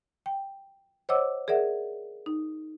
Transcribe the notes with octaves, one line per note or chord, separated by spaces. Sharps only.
G5
C5 C#5 D#5 F#5 D6 E6
G#4 A#4 D5 E5 F#5
D#4